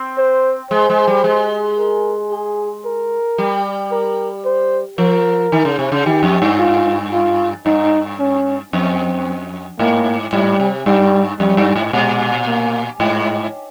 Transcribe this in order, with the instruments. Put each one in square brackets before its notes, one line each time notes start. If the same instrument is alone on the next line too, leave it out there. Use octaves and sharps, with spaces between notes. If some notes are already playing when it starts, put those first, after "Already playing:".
Already playing: [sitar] C4
[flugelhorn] C5
[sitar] G#3 [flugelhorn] C5
[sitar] G#3
G3
G#3
[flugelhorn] A#4
G#4
A#4
[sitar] G3
[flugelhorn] A#4
C5
[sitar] F3 [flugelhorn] A#4
[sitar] D#3
C#3
C3
C#3
[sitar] D#3 [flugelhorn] G4
[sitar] F2
G2
[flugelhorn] F4
F4
[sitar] G2 [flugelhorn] D#4
[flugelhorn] C#4
[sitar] F2 [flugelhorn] C4
[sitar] G#2 [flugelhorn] A#3
[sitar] G#2 [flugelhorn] G3
[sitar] C3
[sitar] G2 [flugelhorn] G3
[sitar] F2 [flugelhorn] G3
[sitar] G2
G#2
[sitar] A#2 [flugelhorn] G#3
[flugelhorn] A#3
[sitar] G#2 [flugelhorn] G#3